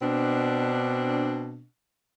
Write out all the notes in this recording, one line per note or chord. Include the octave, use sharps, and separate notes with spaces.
B2 C4 D4